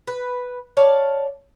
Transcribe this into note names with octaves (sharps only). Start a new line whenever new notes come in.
B4
C#5 D5 F5 A5